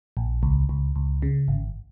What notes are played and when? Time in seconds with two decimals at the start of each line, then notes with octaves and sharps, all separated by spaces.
0.17 A#1
0.43 C#2
0.69 C#2
0.96 C#2
1.22 C#3
1.48 G#1